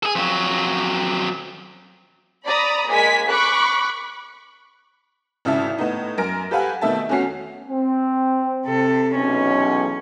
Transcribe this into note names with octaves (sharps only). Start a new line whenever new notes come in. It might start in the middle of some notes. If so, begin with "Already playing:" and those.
G#4 A4
F2 F#3
D5 A#5 B5 D#6
G#3 A#3 G#5 B6
B5 C#6 D6 F#6
G#1 C#3 E4 E5 A5
A2 B3 D#4
F#2 A#4 A#5 F6 A#6 D7
G4 A4 B4 F5 F#5 G#5
B2 D#3 A3 E5 A5
E2 A3 C#4 F#4 C7
C4
C3 A4
B1 E2 C#4